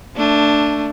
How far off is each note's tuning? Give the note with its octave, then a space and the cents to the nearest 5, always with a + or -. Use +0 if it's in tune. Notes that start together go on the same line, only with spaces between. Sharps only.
A3 +20 D4 +0